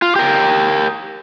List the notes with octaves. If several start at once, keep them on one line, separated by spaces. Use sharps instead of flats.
F4
G4 A#4